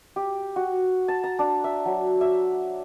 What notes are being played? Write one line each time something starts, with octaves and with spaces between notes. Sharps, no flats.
G4
F#4
A5
A#5
D4
E5
F#3
E5